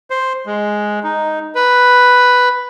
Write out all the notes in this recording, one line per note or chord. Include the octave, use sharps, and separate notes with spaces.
C5
G#3
D#4
B4